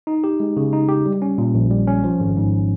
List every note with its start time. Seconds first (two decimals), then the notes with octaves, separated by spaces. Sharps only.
0.07 D#4
0.24 G4
0.40 G#3
0.57 C#3
0.73 D#4
0.89 G4
1.06 G3
1.22 C#4
1.38 A#2
1.54 A#1
1.71 G3
1.87 C#4
2.04 F3
2.20 G#1
2.37 G#2